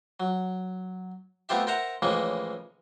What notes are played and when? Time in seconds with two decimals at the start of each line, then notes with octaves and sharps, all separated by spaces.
0.20 F#3
1.49 A3 B3 C4 F4 G4 E5
1.67 A#4 C5 E5 F#5 A#5
2.02 A2 C#3 E3 F3 G#3 A#3